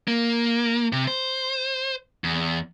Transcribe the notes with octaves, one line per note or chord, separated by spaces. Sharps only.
A#3
C3
C5
E2